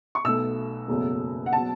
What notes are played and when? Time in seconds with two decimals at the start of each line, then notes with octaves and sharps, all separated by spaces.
0.15 C#6
0.24 B1 B2 A3 E6
0.88 F#1 E2 B2 F#3 A3
1.46 F#5
1.53 B2 F#3 A5